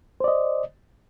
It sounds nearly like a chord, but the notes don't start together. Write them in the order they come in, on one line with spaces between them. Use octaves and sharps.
C5 D5 D#5